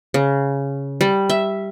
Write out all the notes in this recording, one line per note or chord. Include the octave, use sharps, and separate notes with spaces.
C#3
G3
E5